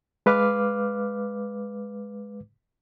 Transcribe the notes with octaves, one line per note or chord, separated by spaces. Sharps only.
G#3 B4 F5 D6 F6